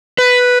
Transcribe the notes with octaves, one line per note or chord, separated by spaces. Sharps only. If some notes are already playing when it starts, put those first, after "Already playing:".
B4